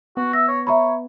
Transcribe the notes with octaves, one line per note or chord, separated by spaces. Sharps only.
B3 F#4
E5 A#6
C#5
C#5 E5 A#5 B5